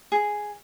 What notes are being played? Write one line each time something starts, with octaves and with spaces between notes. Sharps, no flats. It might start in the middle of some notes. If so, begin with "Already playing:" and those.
G#4